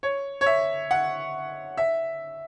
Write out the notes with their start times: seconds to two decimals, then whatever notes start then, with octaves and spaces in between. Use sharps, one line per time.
0.03 C#5
0.41 C#5
0.46 E5
0.91 F#5
1.77 E5